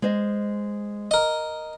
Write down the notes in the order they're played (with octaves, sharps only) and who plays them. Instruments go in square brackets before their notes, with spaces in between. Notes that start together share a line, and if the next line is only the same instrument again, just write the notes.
[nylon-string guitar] G#3 C5 D#5
[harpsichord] A#4 D#5